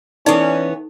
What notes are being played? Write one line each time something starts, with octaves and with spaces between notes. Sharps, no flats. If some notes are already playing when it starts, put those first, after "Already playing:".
E3 B3 C#4 D#4 A4 C#5 D5